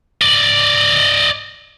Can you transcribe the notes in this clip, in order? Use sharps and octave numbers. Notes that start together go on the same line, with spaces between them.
D5 D#5